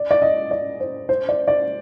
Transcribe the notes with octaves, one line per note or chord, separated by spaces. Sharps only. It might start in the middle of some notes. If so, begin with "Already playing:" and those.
Already playing: D5
D5
D#5
D5
C5
C5
D5
D5